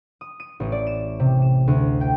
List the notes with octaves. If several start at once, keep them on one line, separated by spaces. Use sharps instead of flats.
D#6
D#7
A1
D5
E7
C3
E7
D2
G5